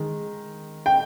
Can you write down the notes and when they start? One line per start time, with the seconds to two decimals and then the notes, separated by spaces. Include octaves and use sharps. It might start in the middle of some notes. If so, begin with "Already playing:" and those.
Already playing: D#3 G#3
0.86 G5